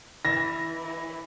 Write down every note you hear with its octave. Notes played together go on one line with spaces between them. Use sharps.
E3 A#6